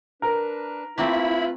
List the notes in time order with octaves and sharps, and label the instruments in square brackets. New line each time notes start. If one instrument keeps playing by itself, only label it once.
[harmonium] D4 B4 [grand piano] A#4
[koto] A3 A#3 C4 [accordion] E4 B5 [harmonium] F4 B4